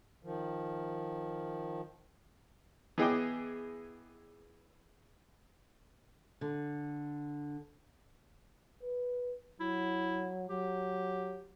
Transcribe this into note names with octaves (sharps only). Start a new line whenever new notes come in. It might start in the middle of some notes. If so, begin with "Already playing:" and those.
D#3 F3
E3 B3 G#4 D#5 G5 D6
D3
B4
F#3 E4
F#3 G4